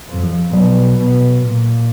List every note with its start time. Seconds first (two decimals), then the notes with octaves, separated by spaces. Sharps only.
0.09 F2
0.24 F3
0.53 B2 F#3
0.98 B2
1.43 A#2